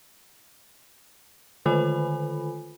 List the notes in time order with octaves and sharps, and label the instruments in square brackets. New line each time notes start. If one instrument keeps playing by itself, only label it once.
[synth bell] D3 D#3 F4 A4 G#5 B5